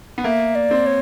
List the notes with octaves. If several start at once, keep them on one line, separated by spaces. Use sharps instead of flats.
B3
A#3 E5
D5
C4
C#5